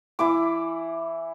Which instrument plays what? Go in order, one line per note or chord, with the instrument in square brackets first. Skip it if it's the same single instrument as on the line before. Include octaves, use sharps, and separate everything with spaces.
[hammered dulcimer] E3 E4 D6